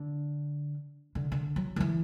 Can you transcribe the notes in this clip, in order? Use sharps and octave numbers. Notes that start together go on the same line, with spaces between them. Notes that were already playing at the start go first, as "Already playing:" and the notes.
Already playing: D3
D3
D3
F#3
D3
E3